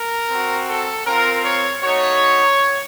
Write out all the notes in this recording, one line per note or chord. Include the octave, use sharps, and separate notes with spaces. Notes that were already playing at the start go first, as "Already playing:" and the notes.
Already playing: A#4
C4 F#4
A4
C4 F4 A#4
C#5
A3 D#4 F#4 C#5